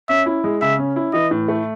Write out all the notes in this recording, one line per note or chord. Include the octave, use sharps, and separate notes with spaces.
C#4 E5
E4
G#3
C#3 E5
C#4
E4
E3 D#5
A2
A3